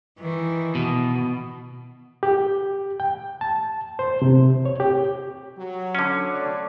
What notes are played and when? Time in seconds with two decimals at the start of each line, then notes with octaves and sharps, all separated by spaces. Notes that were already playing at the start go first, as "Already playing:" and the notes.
0.19 D#3 E3
0.75 B2
2.23 G4
3.00 G5
3.41 A5
3.99 C5
4.22 C3
4.65 C#5
4.80 G4
5.58 F#3
5.95 D3 C#4
6.30 A3 C#5 D5